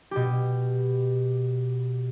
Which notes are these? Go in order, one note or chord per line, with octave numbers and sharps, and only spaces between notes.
B2 G4